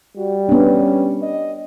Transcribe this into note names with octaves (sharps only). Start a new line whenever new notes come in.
G3 F#4
B3 C#4 D4
D#5